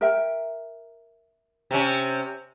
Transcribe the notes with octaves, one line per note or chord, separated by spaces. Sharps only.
A#4 E5 G5
C3 C#4